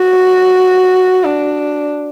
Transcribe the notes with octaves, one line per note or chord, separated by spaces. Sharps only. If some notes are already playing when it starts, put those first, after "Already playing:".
Already playing: F#4
D4